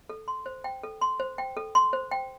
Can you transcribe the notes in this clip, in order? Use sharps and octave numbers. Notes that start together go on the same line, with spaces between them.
A4
C6
C5
G5
A4
C6
C5
G5
A4
C6
C5
G5